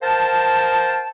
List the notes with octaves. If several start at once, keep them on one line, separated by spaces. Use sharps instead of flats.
A#4 C5 F5 G5 A5